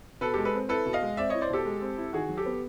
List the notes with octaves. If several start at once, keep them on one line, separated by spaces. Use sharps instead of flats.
B2 A4 B4
G#3 G4 A4
A4 B4
C4
E4 A4 B4
B2
D#5 F5
G#3
C4 D5 E5
E4 C#5 D#5
C5 D5
B2 G4 A4
G#3
C4
E4
D#3 F#4 G#4
F#3
G4 A4
B3